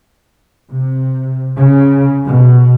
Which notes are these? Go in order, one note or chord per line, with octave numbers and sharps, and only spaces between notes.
C3
C#3
B2